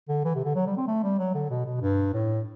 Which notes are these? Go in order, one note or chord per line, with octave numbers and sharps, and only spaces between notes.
D3
E3
C3
D3
F#3
G3
C4
A3
G3
F#3
D3
B2
B2
G2
A2